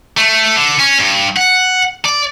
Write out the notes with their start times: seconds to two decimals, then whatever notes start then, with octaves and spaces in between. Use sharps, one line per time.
0.17 A3
0.56 D3
0.80 C#4
1.00 G2
1.37 F#5
2.05 D5